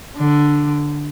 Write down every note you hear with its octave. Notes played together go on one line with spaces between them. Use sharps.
D3